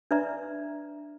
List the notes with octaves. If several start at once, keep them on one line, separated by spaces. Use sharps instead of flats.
D4 B4 D5 E5 A#5